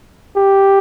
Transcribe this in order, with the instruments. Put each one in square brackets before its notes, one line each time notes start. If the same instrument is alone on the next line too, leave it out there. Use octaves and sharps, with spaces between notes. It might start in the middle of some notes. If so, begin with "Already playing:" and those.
[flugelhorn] G4